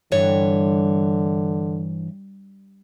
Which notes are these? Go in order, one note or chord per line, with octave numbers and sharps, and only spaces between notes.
G2 D3 E3 C#5